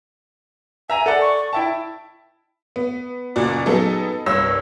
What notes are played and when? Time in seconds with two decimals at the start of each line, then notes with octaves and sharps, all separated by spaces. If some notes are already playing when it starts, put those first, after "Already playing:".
0.90 E5 G#5 A#5
1.06 A4 D5 F#5
1.21 C#6
1.53 E4 E5 G5 A5
2.76 B3
3.36 F#1 A#2 F#4 D5
3.66 F#3 B3 D#4 G#4 A4
4.26 C2 G2 C#5 E6 A#6